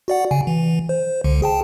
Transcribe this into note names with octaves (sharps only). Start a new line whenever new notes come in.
F#4 D5 F#5
C#3 G#5
E3
C5
C#2 D3
G#4 G5 A5